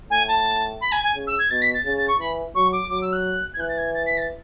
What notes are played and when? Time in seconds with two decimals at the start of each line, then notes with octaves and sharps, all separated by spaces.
0.10 A2 G#5
0.27 A5
0.81 B5
0.92 G#5
1.03 G#5
1.15 C#3
1.27 E6
1.39 G#6
1.50 B2 A6
1.61 B6
1.74 A6
1.85 C#3 A6
1.97 A6
2.08 C#6
2.19 E3 B5
2.55 F#3 C#6
2.72 D6
2.89 F#3 D6
3.01 E6
3.12 F#6
3.54 G#6
3.59 E3 F#6
3.68 A6
3.77 G#6
3.94 A6
4.06 B6
4.17 A6